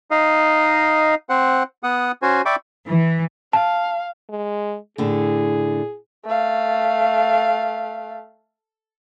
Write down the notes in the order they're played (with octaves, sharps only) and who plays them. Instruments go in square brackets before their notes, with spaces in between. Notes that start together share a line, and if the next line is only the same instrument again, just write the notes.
[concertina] D#4 D#5 F5
C4 C5 F#5
B3 F#5 D#6
C#4 F#4 C5 G#5
D5 E5 G5 B5 C#6 D6
[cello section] E3
[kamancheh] F5 [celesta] A5
[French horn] G#3
[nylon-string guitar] A2 D3 [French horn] G#4
[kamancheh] A3 F5